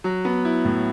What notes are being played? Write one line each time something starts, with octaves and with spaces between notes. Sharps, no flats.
F#3
B3
E4
A2